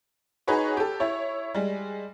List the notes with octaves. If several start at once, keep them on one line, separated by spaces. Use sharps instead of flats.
D#4 F#4 G#4 B4 C#5
G4 A4
E4 C#5
G3 G#3